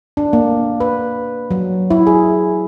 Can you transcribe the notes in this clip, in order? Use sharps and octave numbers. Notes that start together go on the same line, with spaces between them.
D4
A#3
B4
F#3
E4
G#4